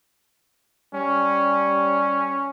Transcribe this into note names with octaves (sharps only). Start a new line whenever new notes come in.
G3 C#4